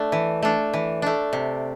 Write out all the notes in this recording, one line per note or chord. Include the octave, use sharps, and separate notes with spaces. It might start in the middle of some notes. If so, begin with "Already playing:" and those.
Already playing: A3 D4
E3
A3 D4
E3
A3 D4
C3